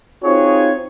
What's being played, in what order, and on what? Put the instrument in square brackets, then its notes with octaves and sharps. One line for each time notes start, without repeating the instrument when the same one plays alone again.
[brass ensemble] C4 D#4 F4 F#4 G#4 C#5